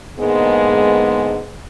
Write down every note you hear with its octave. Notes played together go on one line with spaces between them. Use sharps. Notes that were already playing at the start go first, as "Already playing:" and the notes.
G#2 D3 G#3 A#3 B3